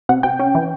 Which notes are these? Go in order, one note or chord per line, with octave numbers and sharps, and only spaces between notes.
C3 F#5
C3 G5
C#4
E3